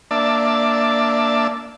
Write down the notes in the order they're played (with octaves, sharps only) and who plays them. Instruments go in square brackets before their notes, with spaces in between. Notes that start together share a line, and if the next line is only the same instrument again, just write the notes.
[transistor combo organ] A#3 D4 D5 E5 A5